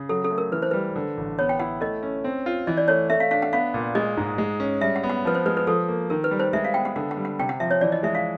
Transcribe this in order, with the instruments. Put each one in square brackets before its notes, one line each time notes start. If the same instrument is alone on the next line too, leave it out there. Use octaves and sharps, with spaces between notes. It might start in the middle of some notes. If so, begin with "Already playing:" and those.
Already playing: [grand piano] C#3
[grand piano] F#3 [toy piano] A4
[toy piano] A4
[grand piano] A3
[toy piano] A#4
[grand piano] E3 [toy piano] B4
[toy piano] C5
[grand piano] G3 [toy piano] B4
[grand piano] D3
A1
[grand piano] B3 [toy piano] C#5
[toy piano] G5
[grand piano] E4 [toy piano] F#5
[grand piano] A3 [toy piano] D#5
[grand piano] C#4
C4
F4
[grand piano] E3 [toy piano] D#5
[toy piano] D5
[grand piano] A3 [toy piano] C#5
[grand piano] A3 [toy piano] E5
[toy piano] F5
[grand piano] D4 [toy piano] F5
[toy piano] F#5
[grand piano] B3 [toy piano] F5
[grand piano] A#2
[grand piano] G#3 [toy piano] D#5
[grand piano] G#2
G#3
C#4
[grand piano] G3 [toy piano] E5
[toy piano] F#5
[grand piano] B3
[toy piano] F#5
[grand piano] F3 [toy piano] B4
[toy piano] C5
[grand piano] G#3 [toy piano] B4
[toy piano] B4
[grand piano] F3 [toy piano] A4
[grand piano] A#3
[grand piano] D#3 [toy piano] A#4
[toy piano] B4
[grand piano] G3
[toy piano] C5
[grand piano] G#3 [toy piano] E5
[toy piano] F5
[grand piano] B3 [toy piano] G5
[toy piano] F#5
[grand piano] D3 [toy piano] F#5
[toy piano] F#5
[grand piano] G3
[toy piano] F#5
[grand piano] C3 [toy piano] G5
[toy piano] F#5
[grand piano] F3 [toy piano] E5
[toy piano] C#5
[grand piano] E3 [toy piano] D5
[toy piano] D#5
[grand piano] G#3 [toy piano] E5
[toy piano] F5